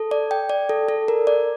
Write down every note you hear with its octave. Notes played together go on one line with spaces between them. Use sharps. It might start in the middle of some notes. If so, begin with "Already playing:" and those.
Already playing: A4
D5
G5
D5
A4
A4
A#4
D5